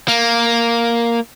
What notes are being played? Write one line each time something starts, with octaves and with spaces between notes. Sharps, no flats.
A#3